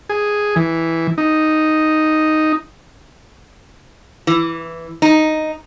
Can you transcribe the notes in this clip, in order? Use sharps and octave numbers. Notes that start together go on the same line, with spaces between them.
G#4
E3
D#4
E3
D#4